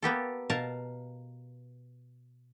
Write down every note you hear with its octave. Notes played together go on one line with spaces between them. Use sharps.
A#3 B3 G4 A4
B2 A#4 F5 A5